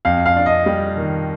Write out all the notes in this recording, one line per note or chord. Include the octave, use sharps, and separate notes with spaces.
F2 F5
F5
D4
D#5
G3
D#3